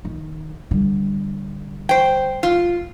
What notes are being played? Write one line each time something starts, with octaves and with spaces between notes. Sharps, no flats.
D#3
D3 G3
C5 G5
F4